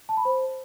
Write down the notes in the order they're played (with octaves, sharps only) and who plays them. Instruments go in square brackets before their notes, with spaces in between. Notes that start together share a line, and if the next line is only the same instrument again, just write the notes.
[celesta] A5
B5
C5